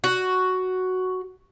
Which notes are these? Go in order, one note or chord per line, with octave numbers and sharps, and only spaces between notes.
F#4